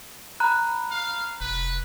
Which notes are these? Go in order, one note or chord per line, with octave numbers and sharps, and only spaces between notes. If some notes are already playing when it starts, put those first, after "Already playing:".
A#5 B5 F#6
F5
F1 B4